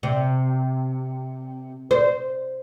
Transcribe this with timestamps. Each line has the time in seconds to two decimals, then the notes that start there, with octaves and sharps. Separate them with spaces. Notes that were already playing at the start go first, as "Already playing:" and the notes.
0.03 C3
1.91 C5